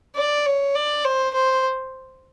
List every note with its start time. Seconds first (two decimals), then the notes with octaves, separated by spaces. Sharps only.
0.16 D5
0.46 C#5
0.75 D5
1.05 C5
1.34 C5